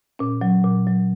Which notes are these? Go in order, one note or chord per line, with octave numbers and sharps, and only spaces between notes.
A#2 C#4
F#3
A#2
F#3